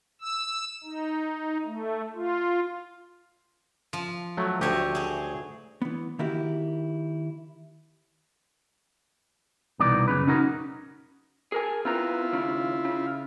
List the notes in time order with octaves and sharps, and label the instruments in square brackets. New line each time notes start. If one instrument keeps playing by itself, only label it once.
[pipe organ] E6
D#4
A3
F4
[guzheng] F3
[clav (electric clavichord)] F#3 A3
[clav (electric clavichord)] D2 G4 [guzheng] A3 C#5 D#5
[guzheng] F#3 G#4
[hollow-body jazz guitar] E3 B3
D#3 A#3 E4 F#4 G4
[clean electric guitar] C2 B2 E3 D#4 D5
F#2 C#3 B4
C#4 D#4 F#4 A#4
G#4 A#4 G#5
[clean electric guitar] B3 C4 A#5 [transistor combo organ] E4 F4
[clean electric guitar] D#2 C#3
C#3